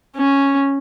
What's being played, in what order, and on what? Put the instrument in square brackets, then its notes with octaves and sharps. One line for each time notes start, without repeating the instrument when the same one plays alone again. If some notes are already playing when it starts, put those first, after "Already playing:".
[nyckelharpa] C#4